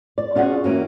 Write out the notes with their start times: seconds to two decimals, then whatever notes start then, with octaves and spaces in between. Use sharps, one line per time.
0.18 D5
0.35 C#4 F4 F#4 G#4 F#5
0.64 E3 A#3 C#4 F#4